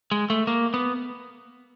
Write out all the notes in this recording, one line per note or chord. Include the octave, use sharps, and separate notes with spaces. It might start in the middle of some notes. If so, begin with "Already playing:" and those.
G#3
A3
A#3
B3